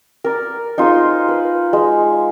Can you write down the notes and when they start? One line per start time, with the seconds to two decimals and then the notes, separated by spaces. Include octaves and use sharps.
0.24 A#4 D5
0.78 D#4 F4 G#4 C5
1.28 B4
1.73 G#3